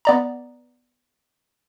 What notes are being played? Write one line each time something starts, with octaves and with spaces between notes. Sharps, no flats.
B3 D5 A#5